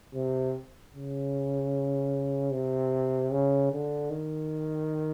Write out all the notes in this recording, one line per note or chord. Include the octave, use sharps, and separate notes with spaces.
C3
C#3
C3
C#3
D3
D#3